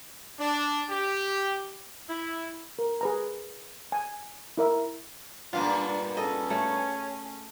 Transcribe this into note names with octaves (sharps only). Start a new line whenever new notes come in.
D4
G4
E4
A#4
G#4 B4 A#5
G#5
E4 A#4 E5
G2 A#2 B3 D4 F4 F5
C#4 G#4 A4 D#5
A3 C#5